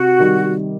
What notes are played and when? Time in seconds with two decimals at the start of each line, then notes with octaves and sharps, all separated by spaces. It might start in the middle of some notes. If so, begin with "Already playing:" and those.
Already playing: C3 F#4
0.19 D#3 G3